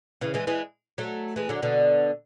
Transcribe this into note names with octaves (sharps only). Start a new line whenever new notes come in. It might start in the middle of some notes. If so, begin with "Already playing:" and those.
C#3 E3
E3 G#3
E3 G#3
F#3 A3
E3 G#3
D3 F#3
B2 D3